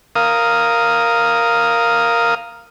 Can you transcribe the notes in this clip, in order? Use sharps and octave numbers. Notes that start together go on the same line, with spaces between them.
A#4 F5 D#6